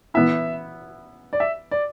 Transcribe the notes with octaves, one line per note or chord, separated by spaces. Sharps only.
E3 B3 E4 E5
D5
E5
D5